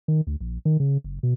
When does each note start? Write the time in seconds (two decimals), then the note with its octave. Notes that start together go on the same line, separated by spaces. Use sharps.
0.08 D#3
0.27 D2
0.40 A#1
0.65 D#3
0.80 C#3
1.04 F#1
1.23 B2